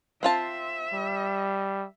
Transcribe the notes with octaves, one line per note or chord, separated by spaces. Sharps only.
C4 F4 E5 A5
G3